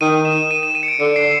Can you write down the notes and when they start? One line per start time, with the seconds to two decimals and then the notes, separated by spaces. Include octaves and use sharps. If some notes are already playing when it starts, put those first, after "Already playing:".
0.01 D#3 D#7
0.25 E7
0.51 D#7
0.63 E7
0.75 D#7
0.83 C#7
0.88 D7
1.00 D3 C#7
1.16 C7